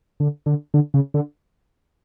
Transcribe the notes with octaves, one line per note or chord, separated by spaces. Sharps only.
D3
D3
D3
C#3
D3